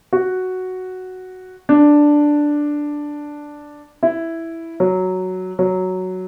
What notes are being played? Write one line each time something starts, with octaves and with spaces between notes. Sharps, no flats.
F#4
D4
E4
F#3
F#3